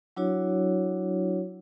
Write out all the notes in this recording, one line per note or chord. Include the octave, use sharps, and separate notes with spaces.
F#3 D4 E4 F#4 C#5